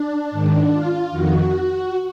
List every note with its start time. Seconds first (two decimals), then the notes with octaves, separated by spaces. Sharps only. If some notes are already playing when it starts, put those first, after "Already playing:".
Already playing: D4
0.31 G#2 D#3
0.71 F4
1.11 F2 D#3 F#4